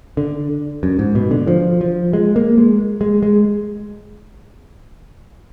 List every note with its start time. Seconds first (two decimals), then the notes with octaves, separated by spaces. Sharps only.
0.17 D3
0.83 F#2
0.99 G#2
1.15 B2
1.31 D3
1.47 F3
1.81 F3
2.13 G#3
2.36 A#3
2.58 G#3
3.01 G#3
3.23 G#3